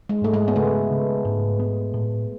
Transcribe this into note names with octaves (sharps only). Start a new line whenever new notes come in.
G#3
G#2 A3
G#3
B3
C#3 A3
C#3
G#2
B3
A2